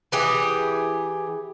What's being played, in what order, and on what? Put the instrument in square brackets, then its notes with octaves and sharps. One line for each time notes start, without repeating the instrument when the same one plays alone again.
[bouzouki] E3 G4 G#4